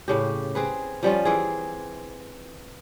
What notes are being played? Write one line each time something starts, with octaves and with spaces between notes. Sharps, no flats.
A2 C#3 G4
C4 G#4 B4
F3 G3 C#4 F4
E3 C4 G#4